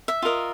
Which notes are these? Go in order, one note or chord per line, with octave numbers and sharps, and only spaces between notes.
E5
F4 A#4 D#5